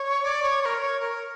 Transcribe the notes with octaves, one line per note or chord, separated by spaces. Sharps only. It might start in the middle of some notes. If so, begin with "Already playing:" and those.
Already playing: C#5
D5
C#5
C#5
A#4
C#5
A#4